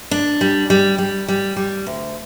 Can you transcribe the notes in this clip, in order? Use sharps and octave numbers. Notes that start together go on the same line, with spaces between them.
D4
G3
G3
G3
G3
G3
D2